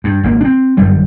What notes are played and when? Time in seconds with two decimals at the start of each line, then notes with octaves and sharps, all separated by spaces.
0.04 G2
0.23 G#1 A#3
0.41 C4 D4
0.77 G1 F#2 D3 G3